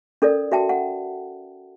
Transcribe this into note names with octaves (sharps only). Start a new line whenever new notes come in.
C#4 A4 A#4 D5
F#4 E5 G5 A5
F#5